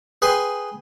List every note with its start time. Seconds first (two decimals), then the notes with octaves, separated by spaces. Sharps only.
0.22 G#4 B4 G5 G#5 C6